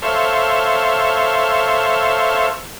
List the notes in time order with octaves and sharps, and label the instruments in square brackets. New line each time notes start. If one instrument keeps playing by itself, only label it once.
[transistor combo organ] A4 C5 C#5 E5 F5